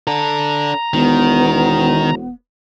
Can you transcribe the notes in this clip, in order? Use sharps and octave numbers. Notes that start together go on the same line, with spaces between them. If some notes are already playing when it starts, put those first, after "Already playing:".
D4 A4 A#5
E1 D#3 B3